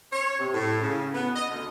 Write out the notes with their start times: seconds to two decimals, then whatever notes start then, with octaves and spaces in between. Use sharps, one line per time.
0.13 C#5
0.39 C3
0.54 A2
0.81 C#3
1.14 B3
1.36 D#5
1.49 D2